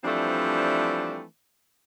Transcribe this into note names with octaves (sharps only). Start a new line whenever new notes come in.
E3 F3 G3 A3 C4 D4